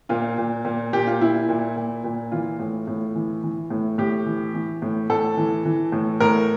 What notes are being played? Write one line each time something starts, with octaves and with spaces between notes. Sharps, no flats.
A#2 F4
A#2
A#2
A#2 G4
F4
A#2 E4
A#2
A#2
A#2
E3 F4
A2
A2
E3
E3
A2
A2 G4
E3
E3
A2
A2 A4
E3
E3
A2
A2 A#4